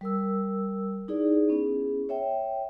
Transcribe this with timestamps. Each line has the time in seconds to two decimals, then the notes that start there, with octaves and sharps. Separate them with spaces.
0.01 G3 A#4 E6
1.08 D#4 E4 G#4 B4 D5
1.49 B3 C#4 E4 G#4
2.09 C#5 E5 G5